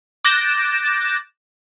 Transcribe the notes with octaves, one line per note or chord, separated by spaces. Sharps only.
D6 F#6 G6 A6 A#6 E7